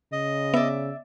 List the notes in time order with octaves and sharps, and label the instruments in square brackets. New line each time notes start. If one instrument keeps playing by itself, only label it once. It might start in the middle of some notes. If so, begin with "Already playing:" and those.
[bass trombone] C#3 [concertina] D#5
[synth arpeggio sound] B3 [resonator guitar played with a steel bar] D5 E5